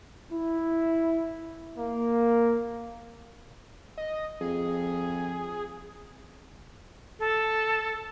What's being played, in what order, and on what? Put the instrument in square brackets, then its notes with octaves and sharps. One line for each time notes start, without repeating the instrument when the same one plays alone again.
[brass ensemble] E4
A#3
[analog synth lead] D#5
[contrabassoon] F2 [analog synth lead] G#4
[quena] A4